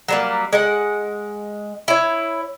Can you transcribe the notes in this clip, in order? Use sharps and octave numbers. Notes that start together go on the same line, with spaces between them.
F#3 G3 A#3
G#3 F#5
E4 C#5